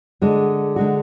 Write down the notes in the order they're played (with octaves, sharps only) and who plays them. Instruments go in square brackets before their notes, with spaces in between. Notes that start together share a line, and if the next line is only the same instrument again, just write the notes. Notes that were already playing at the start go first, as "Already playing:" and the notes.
[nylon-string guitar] D3 G#3 D4 F#4
D3 G#3 D4 F#4